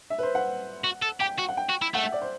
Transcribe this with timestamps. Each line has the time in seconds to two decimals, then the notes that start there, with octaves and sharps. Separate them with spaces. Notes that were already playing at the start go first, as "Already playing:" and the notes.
0.10 E5
0.18 B4
0.23 C5
0.35 F#5
0.84 F#4
1.02 A4
1.20 G4 G5
1.39 F#4
1.49 F#5
1.57 G5
1.70 F#4
1.82 E4
1.94 A3 F#5
2.03 E5
2.12 D5
2.22 C5